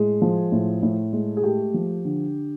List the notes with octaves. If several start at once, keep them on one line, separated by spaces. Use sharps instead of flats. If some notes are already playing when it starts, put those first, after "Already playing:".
Already playing: A2 G#3 G#4
F3
A2
A2
G#3
G#4
A3 G4
F3
D3